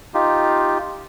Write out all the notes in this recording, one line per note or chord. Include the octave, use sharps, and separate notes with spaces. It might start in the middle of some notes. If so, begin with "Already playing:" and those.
D#4 F4 G4